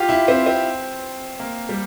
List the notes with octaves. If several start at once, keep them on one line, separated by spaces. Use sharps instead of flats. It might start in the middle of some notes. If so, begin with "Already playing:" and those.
Already playing: F4 G4
E4
C4
C4
A#3
G3